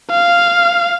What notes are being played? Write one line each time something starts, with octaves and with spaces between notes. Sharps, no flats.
F5